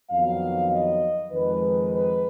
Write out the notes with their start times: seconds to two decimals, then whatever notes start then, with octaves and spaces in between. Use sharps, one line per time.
0.10 F2 D#3 F#3 B3 F5
0.71 D#5
1.32 F2 D#3 G#3 B4
1.93 B4